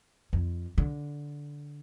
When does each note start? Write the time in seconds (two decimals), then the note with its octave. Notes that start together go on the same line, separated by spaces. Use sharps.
0.33 F2
0.78 D3